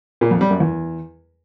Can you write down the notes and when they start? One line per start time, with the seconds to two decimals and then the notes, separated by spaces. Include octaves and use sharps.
0.21 A#2
0.31 F2
0.41 G3
0.51 F#2
0.60 E2